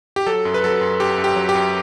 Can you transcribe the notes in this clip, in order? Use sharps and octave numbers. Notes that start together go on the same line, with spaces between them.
G4
F#3 A4
F#2
B4
F#3 A4
F#2
F#2 G4
F#2
G4
F#3
G4
F#2